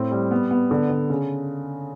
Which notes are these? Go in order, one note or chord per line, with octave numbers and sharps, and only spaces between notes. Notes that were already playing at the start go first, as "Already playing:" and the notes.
Already playing: A2 C4
G3
B3
B3
D3
D3
C#3